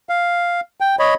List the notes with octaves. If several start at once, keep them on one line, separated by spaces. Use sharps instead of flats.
F5
G5
C#5 D#5 B5